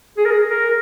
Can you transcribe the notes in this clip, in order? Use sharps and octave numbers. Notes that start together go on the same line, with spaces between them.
G#4
A#4
G#4
A#4